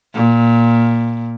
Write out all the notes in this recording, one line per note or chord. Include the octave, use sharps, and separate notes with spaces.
A#2